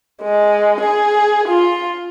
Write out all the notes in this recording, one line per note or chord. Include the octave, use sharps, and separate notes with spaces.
G#3
G#4
F4